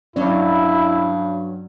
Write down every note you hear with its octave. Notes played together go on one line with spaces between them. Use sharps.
G2 F#3 C#4 E4 D5